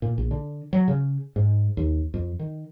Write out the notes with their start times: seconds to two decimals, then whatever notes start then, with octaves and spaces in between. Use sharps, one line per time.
0.02 A#2
0.18 A#1
0.31 D3
0.73 F#3
0.88 C#3
1.36 G#2
1.77 D#2
2.14 F2
2.39 D#3